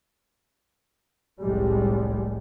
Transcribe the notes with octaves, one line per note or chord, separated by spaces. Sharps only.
F1 C2 A2 G3 G#3